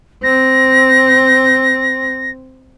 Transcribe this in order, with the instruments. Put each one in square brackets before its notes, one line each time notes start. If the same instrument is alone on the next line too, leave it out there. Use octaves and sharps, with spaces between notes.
[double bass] C4 [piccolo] A#6